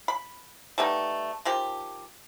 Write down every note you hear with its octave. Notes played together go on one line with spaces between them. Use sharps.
B5
G3 A3 B3 D#4
D#3 F3 G4